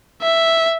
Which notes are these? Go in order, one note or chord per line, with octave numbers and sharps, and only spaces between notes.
E5